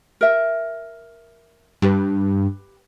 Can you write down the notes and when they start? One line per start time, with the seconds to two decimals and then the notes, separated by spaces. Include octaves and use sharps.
0.21 A#4 E5
1.82 G2 G4 B4